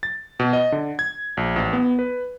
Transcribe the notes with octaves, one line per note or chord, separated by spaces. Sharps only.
A6
B2
D#5
D3
G#6
A#1
A1
B3
B4